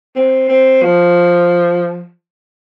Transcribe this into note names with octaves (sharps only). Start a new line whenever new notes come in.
C4
C4
F3